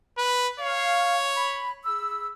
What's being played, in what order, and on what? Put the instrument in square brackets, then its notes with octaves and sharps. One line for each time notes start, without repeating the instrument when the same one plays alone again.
[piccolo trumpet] B4
[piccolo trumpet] C#5 [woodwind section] F5
[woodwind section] B5
G#4 B5 E6